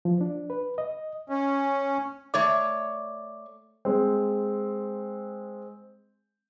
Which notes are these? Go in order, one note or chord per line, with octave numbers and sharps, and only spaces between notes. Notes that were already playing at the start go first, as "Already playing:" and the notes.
F3
D4
B4
D#5
C#4
A3 C#5 D5 D6
G#3 C4